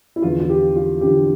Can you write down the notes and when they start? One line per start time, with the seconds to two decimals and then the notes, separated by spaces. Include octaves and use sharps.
0.16 E4
0.22 E2 D3 F3 F4
0.40 F4
0.50 G4
0.76 F4
1.01 E2 D3 F3 G4